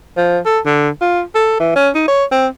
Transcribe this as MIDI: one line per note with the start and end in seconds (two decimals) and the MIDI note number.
0.17 0.39 53
0.46 0.59 69
0.66 0.89 50
1.01 1.22 65
1.35 1.58 69
1.60 1.75 52
1.76 1.90 61
1.95 2.04 63
2.08 2.25 73
2.32 2.47 60